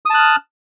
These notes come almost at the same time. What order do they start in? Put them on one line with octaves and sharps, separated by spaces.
D#6 A5 F#6 F6